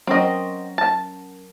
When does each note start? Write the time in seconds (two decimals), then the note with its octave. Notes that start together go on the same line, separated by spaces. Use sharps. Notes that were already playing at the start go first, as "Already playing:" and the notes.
0.07 F#3 C4 C#4 A#4 D#5
0.78 A5